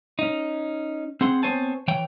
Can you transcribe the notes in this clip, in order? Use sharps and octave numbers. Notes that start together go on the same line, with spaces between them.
C#4 D#4
C4 G#4 F#5 C6
B3 C4 C5 C#5 G#5 A5
E3 C#5 G5